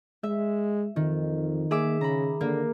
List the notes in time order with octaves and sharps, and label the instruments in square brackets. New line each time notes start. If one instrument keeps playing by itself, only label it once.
[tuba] G#3 [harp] E5
[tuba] F2 [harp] D#3
[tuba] A#3 [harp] G#4 E5 D6
[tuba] C#3 [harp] A#5 B5
[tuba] D3 [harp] A#3